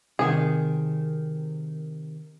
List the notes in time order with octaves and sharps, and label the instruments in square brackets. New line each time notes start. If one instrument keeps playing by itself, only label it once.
[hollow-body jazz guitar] C3 D#3 [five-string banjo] G#4